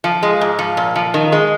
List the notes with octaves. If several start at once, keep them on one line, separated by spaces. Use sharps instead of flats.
F3
G#3
G#2
F3
A#2
F3
D#3
G#3